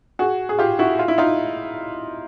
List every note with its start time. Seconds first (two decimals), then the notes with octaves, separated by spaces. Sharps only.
0.19 F#4 G#4
0.49 G#4
0.59 F4 G4
0.79 E4 F#4
0.99 F4
1.08 E4
1.18 D#4 F4